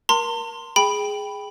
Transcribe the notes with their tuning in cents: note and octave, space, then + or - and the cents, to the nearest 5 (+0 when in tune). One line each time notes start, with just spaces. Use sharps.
A#4 +20 A5 +45 C6 +0
G#4 +0 G5 +5 B5 +0